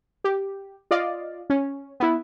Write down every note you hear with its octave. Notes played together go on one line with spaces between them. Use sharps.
G4
F4 D5 D#5 F5
C#4
B3 E4